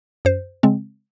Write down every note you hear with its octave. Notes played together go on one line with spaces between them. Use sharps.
F#2 C5
C#3 G#3 C4